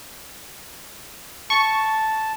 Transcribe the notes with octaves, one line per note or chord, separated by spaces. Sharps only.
A5 C#6